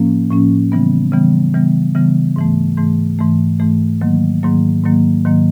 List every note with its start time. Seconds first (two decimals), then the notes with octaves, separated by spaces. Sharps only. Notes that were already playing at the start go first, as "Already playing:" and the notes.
Already playing: A2 F3 A#3 C#4
0.30 A2 F3 A#3 C#4
0.72 C#3 E3 G3 B3
1.12 C#3 E3 G3 B3
1.54 C#3 E3 G3 B3
1.95 C#3 E3 G3 B3
2.36 G#2 E3 A3
2.77 G#2 E3 A3
3.19 G#2 E3 A3
3.60 G#2 E3 A3
4.01 G#2 D#3 F#3 A#3
4.43 G#2 D#3 F#3 A#3
4.84 G#2 D#3 F#3 A#3
5.25 G#2 D#3 F#3 A#3